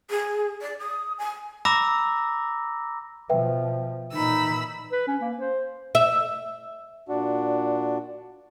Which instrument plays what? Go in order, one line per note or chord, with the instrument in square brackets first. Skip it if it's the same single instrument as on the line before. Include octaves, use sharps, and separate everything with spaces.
[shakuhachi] G#4
D5
D#6
G#5
[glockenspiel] A#5 B5 D6 E6 A#6
[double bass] B2 F3 [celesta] B4 E5 G5
[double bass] A#2 E3 [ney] D#4 [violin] B5 E6
[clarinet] B4
C#4
A#3
C5
[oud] E5
[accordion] A#2 D4 F#4